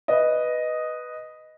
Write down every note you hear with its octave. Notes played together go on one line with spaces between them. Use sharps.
B4 D#5